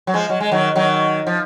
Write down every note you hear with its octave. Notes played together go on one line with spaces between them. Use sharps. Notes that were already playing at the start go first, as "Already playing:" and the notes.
F#3
F3 G#3
F#3
G#3
D#3 F#3
D#3 F#3
F3